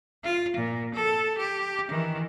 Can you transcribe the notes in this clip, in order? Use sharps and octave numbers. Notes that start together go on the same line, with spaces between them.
F4
A#2
A4
G4
D#3 E3